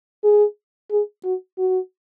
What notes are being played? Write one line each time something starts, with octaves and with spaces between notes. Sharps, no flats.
G#4
G#4
F#4
F#4